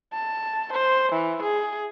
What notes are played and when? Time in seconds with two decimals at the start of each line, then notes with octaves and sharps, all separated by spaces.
0.14 A5
0.73 C5
1.13 E3
1.43 G#4